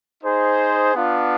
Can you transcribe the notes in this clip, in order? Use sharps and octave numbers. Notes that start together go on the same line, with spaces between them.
D#4 G#4 C5
B3 D4 F4